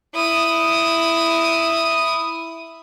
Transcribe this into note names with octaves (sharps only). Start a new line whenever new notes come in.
E4 D#6